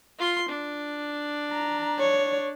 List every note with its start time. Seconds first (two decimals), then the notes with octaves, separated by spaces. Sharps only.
0.19 F4 C6
0.48 D4
1.51 A#5
1.99 C#5